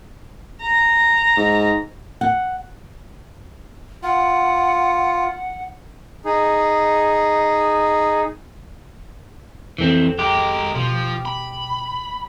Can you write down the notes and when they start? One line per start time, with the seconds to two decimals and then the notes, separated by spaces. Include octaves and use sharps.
0.61 A#5
1.37 G#2
2.21 F#5
4.03 F4 F#5
6.25 D#4 G#4
9.78 F2 E3 C4 A4 E7
10.19 G#3 G4 A#4
10.75 B2 F3
11.25 B5